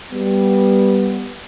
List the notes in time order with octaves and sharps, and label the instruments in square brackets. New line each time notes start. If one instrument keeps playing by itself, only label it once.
[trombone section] G3 B3